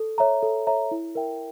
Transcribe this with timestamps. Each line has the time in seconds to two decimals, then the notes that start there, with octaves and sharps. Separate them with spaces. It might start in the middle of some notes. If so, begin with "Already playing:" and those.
Already playing: A4
0.18 C#5 E5 A#5
0.43 A4
0.67 C#5 E5 A#5
0.91 E4
1.15 A#4 E5 G5